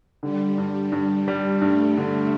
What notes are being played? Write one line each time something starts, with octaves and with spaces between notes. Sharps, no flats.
D3 G3
G2
G2
G3
G2 A3
D3